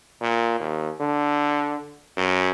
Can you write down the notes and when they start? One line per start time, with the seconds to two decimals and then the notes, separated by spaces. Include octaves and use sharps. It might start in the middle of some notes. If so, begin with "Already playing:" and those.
0.21 A#2
0.60 D#2
1.00 D3
2.17 F#2